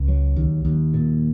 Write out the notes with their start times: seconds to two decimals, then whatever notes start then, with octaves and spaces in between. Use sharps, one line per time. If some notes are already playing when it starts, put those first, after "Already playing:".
Already playing: C#2
0.08 F#3
0.36 D#2
0.65 D#2
0.94 A#2